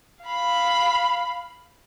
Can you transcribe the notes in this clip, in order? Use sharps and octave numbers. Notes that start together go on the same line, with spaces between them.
F5 B5